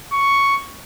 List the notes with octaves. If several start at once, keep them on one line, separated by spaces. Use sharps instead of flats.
C#6